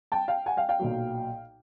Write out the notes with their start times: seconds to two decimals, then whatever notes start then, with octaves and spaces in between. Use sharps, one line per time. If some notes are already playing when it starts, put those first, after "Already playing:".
0.12 G5 A5
0.28 F5 G5
0.46 F#5 G#5
0.57 F5 G5
0.69 F5 G5
0.79 B1 A#2 F#3